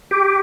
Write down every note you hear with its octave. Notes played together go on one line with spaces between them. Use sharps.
G4